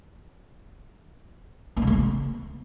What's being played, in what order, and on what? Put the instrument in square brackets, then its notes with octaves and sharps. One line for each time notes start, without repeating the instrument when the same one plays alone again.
[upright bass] A#3
C3
G#3
B3